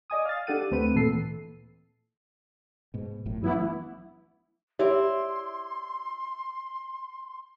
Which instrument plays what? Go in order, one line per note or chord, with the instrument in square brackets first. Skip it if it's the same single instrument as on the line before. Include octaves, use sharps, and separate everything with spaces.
[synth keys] D5 D#5 G#5 D#6
F5 A6
D4 G4 A4 F#5 D#7
D2 A3 C4 B4 D#7
A#2 E3 A4 C7
[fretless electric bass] G#2 B2
G1 F#2 A2
[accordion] E3 B3 E4 [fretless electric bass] F#3 A3
[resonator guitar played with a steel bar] E4 D5 [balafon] G4 [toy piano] C#5 E5 [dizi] C6